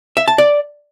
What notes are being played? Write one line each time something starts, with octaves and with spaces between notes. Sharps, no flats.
E5
A5
D5